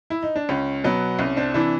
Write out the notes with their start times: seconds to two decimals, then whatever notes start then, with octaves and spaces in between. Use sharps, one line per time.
0.10 E4
0.23 D#4
0.36 D4
0.49 C#2 C#4
0.84 B2 F#3 B3
1.19 C2 C#4
1.37 C4 D4
1.54 C3 E3 D4 E4